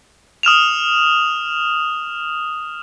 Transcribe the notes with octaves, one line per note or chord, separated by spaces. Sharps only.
D#6 F6 E7 F7